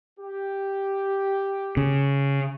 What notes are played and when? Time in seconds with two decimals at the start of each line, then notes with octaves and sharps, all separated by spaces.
0.20 G4
1.77 C#3